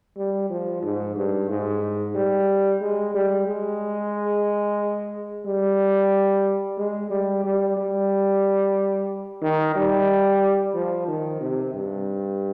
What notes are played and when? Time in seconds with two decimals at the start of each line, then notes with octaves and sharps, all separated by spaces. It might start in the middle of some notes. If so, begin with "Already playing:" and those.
0.17 G3
0.50 F3
0.83 G#2
1.16 G2
1.49 G#2
2.15 G3
2.81 G#3
3.14 G3
3.47 G#3
5.46 G3
6.78 G#3
7.11 G3
7.44 G3
7.77 G3
9.42 D#3
9.75 G3
10.74 F3
11.08 D#3
11.41 C3
11.74 G2